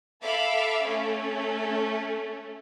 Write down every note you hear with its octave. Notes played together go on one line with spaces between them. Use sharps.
A4 E5 F5 B5 D6
A3 C#4